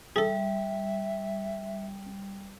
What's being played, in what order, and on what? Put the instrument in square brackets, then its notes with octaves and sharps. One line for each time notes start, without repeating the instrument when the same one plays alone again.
[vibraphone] G3 [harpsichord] G#4 A4 [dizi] E5